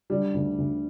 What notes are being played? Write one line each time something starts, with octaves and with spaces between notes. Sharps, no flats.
D3 G3
D2
D2